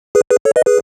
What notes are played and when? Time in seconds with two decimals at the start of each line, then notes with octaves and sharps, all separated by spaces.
0.15 G#4 B4
0.31 G#4 B4
0.45 A4 C#5
0.56 B4 D#5
0.66 G#4 B4